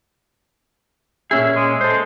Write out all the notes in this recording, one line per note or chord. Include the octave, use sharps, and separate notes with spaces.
A#2 C#4 G#4 E5
G#3
G#3 A4 C5